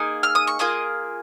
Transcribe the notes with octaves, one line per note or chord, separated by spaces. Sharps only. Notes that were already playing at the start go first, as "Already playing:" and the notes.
Already playing: A#3 D#4 G#4
F6
D#6
C#6
A#3 F4 G#4 D#5 D#6